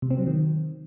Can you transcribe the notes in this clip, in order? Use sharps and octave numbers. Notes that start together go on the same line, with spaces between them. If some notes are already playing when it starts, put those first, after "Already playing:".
C3
C4
F#3
D#3